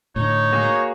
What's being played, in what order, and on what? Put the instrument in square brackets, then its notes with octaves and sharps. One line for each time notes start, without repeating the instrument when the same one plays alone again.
[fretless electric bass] A2 D3 [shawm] D#4 [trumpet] C#5
[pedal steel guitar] A#3 F#4 G#4